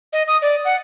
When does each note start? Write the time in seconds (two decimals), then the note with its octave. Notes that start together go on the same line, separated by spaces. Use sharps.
0.13 D#5
0.28 D#6
0.42 D5
0.65 F#5